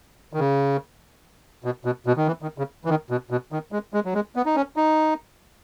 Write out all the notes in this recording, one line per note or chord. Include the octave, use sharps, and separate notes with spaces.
D#3
C#3
B2
B2
B2
D#3
E3
D#3
C#3
E3
D#3
B2
B2
D#3
G#3
G#3
F#3
G#3
B3
D#4
C#4
D#4